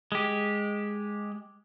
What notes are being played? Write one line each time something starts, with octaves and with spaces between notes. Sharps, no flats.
G#3 G4